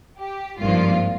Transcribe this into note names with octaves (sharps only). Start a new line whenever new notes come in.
G4
G#1 G2 F3 A#3 F4